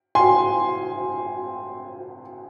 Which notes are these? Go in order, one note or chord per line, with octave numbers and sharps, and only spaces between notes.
G#5 C6